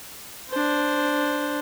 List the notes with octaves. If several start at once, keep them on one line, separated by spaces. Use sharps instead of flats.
D4 C5